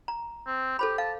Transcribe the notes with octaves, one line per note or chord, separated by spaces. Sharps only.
A#5
C4
G4 A4 C5 B5
F5 A5